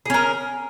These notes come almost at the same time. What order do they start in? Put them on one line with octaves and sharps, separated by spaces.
G#4 C#4 A#4